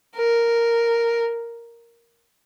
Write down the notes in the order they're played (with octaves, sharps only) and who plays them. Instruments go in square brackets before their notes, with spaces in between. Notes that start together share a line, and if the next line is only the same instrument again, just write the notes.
[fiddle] A#4